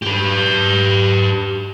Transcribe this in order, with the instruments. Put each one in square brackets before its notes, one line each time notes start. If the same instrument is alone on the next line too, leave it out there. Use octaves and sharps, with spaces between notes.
[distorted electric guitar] G4 B4